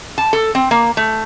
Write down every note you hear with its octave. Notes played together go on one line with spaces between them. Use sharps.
A5
A4
C4
A#3
A3